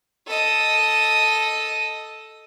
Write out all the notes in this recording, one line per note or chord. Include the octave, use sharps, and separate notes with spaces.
A4 D#5